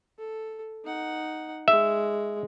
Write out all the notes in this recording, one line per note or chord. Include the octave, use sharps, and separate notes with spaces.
A4
D#4 F#5
G#3 E5